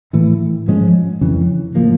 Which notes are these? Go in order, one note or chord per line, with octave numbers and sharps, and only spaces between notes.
A2 E3 A3
G#2 F3 G#3 C#4
F2 C#3 E3
A2 F3 A#3